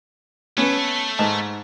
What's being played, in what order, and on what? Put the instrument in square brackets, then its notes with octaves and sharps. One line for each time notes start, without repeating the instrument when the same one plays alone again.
[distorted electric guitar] A3 [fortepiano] B3 C#4
[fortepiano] G#2 D#5 A5